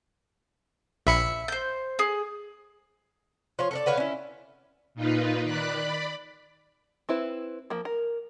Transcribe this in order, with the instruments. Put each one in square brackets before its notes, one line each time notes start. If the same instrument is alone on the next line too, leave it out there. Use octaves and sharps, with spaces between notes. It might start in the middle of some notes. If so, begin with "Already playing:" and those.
[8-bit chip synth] A#1 B5 C#7 [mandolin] E5
[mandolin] C5 G6
G#4
[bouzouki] F3 F4 C#5
A4 A#4 D5
D3 B4 C#5 F5
C#4 E4
[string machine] A#2 D#4 F4 B4
D#3 D5 B5 F#6
D5 B5
[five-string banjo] C4 E4 B4
F3 A#3
A#4